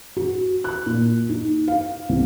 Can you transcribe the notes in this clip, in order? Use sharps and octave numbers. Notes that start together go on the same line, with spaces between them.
F#4
F#6
A#2
D#4
F5
C2